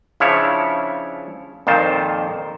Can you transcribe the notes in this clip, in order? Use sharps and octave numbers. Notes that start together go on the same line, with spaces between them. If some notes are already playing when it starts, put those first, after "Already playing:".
C#3 F3 D4 E4 C#5
F2 A#2 D#3 C5 A5